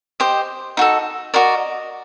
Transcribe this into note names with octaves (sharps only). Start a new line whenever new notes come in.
G4 C5 D#5
D#4 F#4 A4
F#4 A#4 D5 D#5